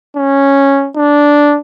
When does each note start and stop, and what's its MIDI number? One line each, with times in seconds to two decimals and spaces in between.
0.17 0.89 61
0.96 1.58 62